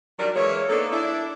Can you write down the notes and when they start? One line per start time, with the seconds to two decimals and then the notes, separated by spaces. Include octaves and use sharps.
0.18 D#3 F#3 G3 D4 A#4 D5
0.35 E3 G#3 A#3 C#5
0.69 A#3 B3 D4 D#4 A4
0.91 D4 E4